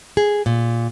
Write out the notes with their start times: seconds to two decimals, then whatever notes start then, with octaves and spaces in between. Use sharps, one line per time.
0.17 G#4
0.46 A#2